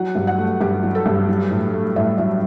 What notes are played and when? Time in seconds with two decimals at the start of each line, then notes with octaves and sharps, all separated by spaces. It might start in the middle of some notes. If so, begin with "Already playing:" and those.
Already playing: F#3 F#5
0.15 G2
0.27 F#5
0.38 A3
0.61 G2 G4
0.83 F#3
0.95 A4
1.06 G2
1.29 F#3
1.51 A2
1.73 A3
1.96 A2 E5
2.18 F#3 E5